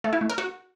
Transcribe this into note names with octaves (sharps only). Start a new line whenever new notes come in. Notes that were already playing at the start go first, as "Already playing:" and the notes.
A3
E4
A3
A#4
F#4